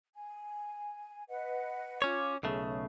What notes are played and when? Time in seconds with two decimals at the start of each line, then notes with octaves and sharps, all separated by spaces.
0.14 G#5
1.29 B4 D#5 F#5
2.02 C#4 F4 C#5 D6
2.43 B1 C#3 A3 G#4